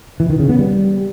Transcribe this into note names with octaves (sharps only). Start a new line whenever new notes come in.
E3
D#3
C#3
B3
G3